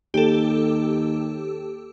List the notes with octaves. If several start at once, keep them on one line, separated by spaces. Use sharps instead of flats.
D#2 G4 A4